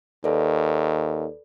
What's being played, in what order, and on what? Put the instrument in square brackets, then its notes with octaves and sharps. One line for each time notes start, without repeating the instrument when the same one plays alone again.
[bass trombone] D#2 [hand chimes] A4 B4 D5